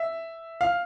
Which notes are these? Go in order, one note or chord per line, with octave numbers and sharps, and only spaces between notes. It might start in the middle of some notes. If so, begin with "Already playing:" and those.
Already playing: E5
F5